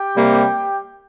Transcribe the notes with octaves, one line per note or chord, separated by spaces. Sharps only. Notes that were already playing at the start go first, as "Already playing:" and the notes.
Already playing: G4 G5
C3 G3 A#3